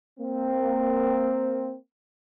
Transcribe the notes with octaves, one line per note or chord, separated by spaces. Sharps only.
A#3 C4